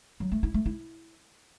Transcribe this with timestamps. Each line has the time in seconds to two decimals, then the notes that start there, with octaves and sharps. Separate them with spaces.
0.20 F#3
0.32 A3
0.43 E4
0.54 A3
0.66 E4